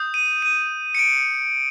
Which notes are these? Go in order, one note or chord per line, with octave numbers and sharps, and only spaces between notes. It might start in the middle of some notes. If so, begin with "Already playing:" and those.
Already playing: D#6 G6
D#7
D#7
C#7
D7